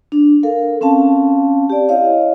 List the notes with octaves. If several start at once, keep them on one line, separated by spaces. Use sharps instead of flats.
D4
A4 A#4 F5
C4 C#4 F5 A5
G4 D5
E4 C#5 D#5 F5